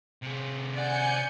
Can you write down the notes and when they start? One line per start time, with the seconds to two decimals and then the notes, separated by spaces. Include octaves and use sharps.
0.23 C3 G#4
0.74 D5 F#5 G#5 G6 C#7